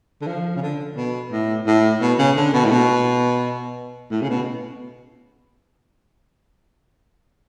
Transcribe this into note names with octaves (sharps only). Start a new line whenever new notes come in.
D3
F3
C#3
D3
B2
A2
A2
B2
C#3
D3
B2
A2
B2
A2
C#3
B2